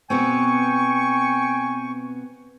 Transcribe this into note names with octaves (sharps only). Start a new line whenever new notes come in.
B2 B3 C4 G5 G#5 C#6